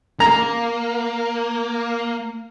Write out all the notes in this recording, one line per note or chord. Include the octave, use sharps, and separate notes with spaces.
A#3 A#5